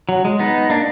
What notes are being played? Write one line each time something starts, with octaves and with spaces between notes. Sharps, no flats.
F#3
G#3
B3 D#4
A#3 D4